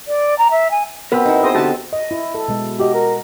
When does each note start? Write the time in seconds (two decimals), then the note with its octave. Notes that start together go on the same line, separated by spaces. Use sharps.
0.08 D5
0.38 A#5
0.51 E5
0.71 G#5
1.12 B2 B3 C4 A#4 B4
1.25 D#4 E4
1.43 G#4 C5 D#5
1.55 D3 F#4 G4 A4 E5 A5
1.93 D#5
2.11 E4
2.35 A4
2.48 B2 G#3
2.79 F#4 G4 D#5
2.94 A#4